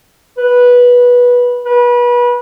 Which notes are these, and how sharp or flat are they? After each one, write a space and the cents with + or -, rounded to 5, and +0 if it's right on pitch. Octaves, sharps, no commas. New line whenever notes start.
B4 -15
B4 -30